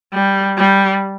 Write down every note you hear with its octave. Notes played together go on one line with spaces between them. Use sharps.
G3
G3